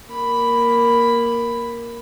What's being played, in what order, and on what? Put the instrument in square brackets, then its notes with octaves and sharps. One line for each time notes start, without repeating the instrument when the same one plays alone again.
[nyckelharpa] A#3 B5